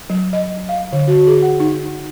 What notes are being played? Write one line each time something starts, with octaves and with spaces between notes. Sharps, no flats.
F#3
D#5
F5
D3
F#4
G#4
F#5
D#4